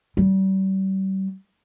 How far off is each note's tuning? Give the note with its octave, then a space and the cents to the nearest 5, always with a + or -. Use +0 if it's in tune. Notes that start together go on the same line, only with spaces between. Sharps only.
G3 -35